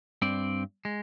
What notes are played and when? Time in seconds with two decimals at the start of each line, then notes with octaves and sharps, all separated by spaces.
0.22 G2 C4 D5
0.85 G#3